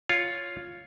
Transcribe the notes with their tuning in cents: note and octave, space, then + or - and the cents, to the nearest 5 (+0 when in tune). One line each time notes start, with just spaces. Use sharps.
F4 +0 C#5 +5